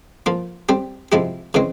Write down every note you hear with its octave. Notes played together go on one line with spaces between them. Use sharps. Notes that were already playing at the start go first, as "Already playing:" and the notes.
F3 A#3 F4
G3 C4 G4
C3 F3 G#3 E4 G4
C#3 E3 G#3 C4